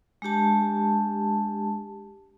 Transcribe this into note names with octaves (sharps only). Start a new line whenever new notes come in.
G#3 D4 G4 A5